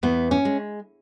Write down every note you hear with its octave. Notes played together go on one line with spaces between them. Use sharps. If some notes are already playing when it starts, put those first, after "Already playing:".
E2 B3
C#4
G#3